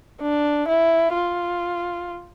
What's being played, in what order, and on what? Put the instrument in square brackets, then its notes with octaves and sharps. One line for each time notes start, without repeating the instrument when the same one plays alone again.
[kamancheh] D4
E4
F4